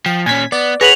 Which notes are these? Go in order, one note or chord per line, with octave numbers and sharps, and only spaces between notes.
F3 G5
A#2 C#4 G#5 G#6 B6
B3 D5
G#4 B4 C#5 F#5 A#6 F7 F#7